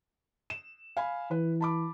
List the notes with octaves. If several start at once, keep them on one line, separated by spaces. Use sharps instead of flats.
E7
F5 G#5 B5
E3 B4
A5 B5 D6